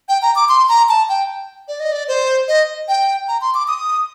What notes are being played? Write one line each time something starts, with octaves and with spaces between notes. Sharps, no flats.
G5
A#5
D6
C6
A#5
A5
G5
D5
D#5
D5
C5
D#5
G5
A#5
C6
D6
D#6